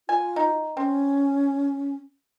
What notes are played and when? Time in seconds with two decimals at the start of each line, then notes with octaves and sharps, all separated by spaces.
0.09 F4 G#5
0.36 D#4
0.77 C4 C#4